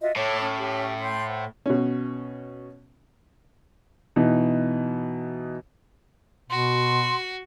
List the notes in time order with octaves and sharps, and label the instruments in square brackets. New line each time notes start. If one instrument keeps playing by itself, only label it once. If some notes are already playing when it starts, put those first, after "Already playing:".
[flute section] F4 F#4 E5 [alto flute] D#5
[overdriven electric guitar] A2 [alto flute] C#5 [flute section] A5 C#6 D6
[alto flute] C#4
[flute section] G4
E5 G5 C6
C5 F#5
[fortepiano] B2 C#4
[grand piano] B2 E3 D#4
[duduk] B2 [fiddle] F#4 [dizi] C6